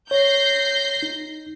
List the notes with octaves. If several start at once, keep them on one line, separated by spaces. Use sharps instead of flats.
C#5 G6 A#6 C7
D#4